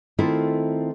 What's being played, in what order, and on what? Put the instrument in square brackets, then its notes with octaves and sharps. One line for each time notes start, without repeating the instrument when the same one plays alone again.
[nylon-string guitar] D#3 A3 C4 E4 F4 A4